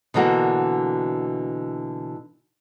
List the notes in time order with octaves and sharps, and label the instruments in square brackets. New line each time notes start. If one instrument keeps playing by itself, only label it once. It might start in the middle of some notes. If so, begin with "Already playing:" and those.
[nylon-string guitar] B2 D3 E3 A#3 F#4